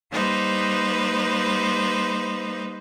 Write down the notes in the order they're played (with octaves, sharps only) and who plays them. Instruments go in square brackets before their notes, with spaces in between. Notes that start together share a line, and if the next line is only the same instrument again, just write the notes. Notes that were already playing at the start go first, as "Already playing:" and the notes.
[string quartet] G3 A#3 D#4 B4 C5